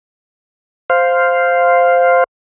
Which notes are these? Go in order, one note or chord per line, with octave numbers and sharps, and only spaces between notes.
C5 F5